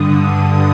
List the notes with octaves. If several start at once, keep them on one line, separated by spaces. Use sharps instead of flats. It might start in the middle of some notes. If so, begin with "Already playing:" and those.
Already playing: G2 D3 D#6